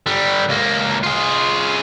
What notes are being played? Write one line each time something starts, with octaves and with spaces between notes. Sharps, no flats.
D3 G3
C#2 A#3
F4 G#4